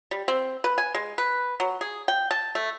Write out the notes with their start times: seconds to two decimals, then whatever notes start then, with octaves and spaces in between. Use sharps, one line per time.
0.11 G3
0.28 C4
0.64 B4
0.78 G#5
0.95 G#3
1.18 B4
1.60 F#3
1.81 G#4
2.08 G5
2.31 A5
2.55 A3